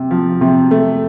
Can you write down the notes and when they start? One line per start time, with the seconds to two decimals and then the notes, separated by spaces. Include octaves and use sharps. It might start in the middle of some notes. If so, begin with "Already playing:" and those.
Already playing: C3
0.11 F3
0.41 C3
0.71 A3